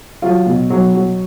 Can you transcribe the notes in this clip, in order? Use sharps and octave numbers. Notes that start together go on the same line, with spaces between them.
F#3 F4
B2
F#3
F#3